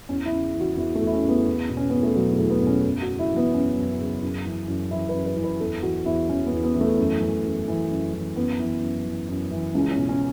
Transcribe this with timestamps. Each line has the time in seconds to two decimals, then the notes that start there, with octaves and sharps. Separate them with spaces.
0.09 E2 C#4
0.26 E4
0.32 C#3
0.54 E3
0.61 F#4
0.77 E2 E4
0.95 A3
1.01 E2
1.07 E4
1.12 C#4
1.24 C#3
1.29 B3
1.47 E2
1.69 B2
1.77 C#4
1.90 E2 B3
2.03 A3
2.15 B2 F#3
2.33 A3
2.38 E2
2.50 B3
2.61 B2
2.67 C#4
2.85 F#2
3.02 F#4
3.08 C#3
3.19 E4
3.30 E3
3.36 B3
3.53 F#2 C#4
3.77 F#2
4.00 C#3
4.22 F#2
4.45 E3
4.68 F#2
4.91 E3 E4
5.09 B4
5.14 F#2
5.26 B4
5.37 E3
5.44 B4
5.60 E2 A4
5.83 E3 F#4
6.06 E2 E4
6.29 E3 C#4
6.46 B3
6.52 E2
6.64 B3
6.75 E3
6.81 A3
6.98 F#2
7.21 E3
7.44 F#2
7.68 E3
7.91 F#2
8.13 E3
8.36 F#2 B3
8.59 E3
8.82 F#2
9.06 E3
9.29 F#2
9.51 E3
9.75 C#2 C#4
9.91 C#4
9.97 B2
10.09 C#4